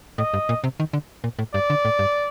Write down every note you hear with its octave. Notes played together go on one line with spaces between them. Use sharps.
A2 D#5
G2
A#2
C3
D#3
D3
A#2
A2
G2 D5
D3
A2
G2